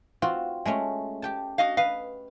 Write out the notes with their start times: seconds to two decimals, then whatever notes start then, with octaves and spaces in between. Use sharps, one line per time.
0.22 C4 F4 F#4
0.66 G#3 A3 C#4
1.22 G4 G5 A5
1.58 F#4 D#5 F5
1.77 B4 D#5 F5